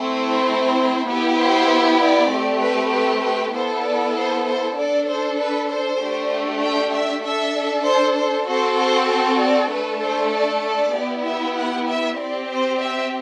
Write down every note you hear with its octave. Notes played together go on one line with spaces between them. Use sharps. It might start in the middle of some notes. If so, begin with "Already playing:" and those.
Already playing: A3 C4 E4
C5
B3 E4 G4
C5
D5
A3 C4 G4
B4
B4
B4
B3 E4 A4 C5
D5
C5
C5
D4 A4 D5
C5
B4
C5
A3 D4 G4
G5
E5
D4 A4 E5
C5
C5
C4 F#4 A4 C5
C5
C5
D5
A3 D4 A4 B4
C5
D5
D5
B3 E4 G4
E5
F#5
E5
C4 G4 D5
C5
E5